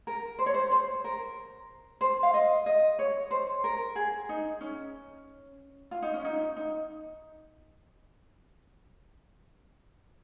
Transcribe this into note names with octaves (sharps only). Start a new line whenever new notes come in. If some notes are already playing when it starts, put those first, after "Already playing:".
A#4
C5
C#5
C5
C5
A#4
C5
F5
D#5
D#5
C#5
C5
A#4
G#4
D#4
C#4
F4
D#4
C#4
D#4
D#4